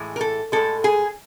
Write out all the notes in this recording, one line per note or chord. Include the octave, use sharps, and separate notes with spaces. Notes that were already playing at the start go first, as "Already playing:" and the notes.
Already playing: A2 E3 G#3
A#4
A4
A2 E3 G#3 A4
G#4